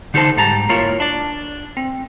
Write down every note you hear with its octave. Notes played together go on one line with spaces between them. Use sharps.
D3 D#4 F#4 A4 C5 A5
G#2 G3 A5 A#5
A#3 E4 F4 A#4 C#5
D4 D5
C4